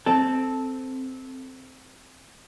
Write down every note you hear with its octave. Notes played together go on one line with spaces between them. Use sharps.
C4 A4